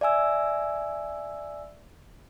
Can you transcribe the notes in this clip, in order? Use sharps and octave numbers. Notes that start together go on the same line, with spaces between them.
D5 E5 G#5 E6